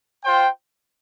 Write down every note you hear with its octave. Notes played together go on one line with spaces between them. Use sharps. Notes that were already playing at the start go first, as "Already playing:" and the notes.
F4 C5 G5